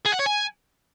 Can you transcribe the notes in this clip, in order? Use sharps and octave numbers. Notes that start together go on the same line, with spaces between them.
G#4
F#5
C#5
G#5